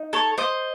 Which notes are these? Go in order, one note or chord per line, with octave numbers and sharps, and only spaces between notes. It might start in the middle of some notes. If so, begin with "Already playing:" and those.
Already playing: D#4
A4 C#5
C5 D#5